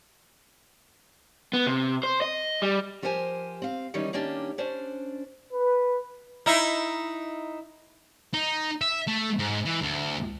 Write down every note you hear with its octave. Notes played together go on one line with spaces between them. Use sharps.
B3
C3
C5
D#5
G3
F3 G4 A#4 C5 G#5
C4 F5
D#3 E3 G3 C#4 D#4
D#3 A#3 C#4 D4 G4
C#4 D4 C5 D5
B4
D#4 E4
D#4
E5
A3
G#2
E3
D2